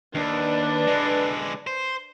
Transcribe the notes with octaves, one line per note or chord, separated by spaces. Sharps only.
D#2 D4 B4
D3 G#3
C5